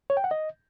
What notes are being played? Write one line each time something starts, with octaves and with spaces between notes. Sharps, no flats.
C#5
G5
F#5
D#5